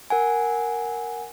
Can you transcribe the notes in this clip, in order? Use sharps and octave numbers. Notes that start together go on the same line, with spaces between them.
A#4 F#5 G#5